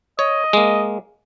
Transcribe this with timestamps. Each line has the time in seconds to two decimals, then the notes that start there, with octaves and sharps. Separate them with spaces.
0.19 C#5 D#5
0.53 G#3 A#3